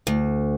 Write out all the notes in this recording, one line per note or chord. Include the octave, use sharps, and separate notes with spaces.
D2